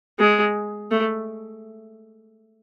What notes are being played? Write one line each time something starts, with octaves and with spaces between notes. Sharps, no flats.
G#3
A3